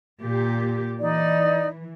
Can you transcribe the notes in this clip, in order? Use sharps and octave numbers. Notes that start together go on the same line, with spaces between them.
A#2 G4
E3 D#4 D5